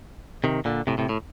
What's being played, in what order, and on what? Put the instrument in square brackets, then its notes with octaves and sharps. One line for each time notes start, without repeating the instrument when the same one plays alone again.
[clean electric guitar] C3 D#3
A#2 D3
A2 C3
A2 C3
A2